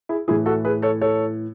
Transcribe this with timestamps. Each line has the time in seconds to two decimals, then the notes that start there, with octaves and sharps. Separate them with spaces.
0.09 E4 G#4
0.28 A2 E3 E4 G#4
0.46 F#4 A4
0.65 G#4 B4
0.82 A4 C#5
1.01 A4 C#5